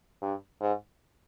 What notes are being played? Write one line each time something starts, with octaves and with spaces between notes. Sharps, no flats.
G2
G#2